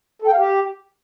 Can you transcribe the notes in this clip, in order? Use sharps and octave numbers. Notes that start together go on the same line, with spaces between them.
A4
G5
F5
G4